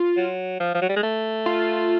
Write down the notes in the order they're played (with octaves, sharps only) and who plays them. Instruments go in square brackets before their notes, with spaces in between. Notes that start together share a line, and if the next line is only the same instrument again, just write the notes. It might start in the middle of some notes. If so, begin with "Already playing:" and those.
Already playing: [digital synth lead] F4
[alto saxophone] F#3
F3
F3
F#3
G3
G#3
A3
[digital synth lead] F4